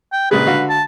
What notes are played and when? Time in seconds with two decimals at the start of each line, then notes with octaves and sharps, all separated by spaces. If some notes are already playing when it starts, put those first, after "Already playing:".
0.12 G5
0.31 A#1 C#3 G#4 B4
0.47 D3 F#4 F5
0.69 A5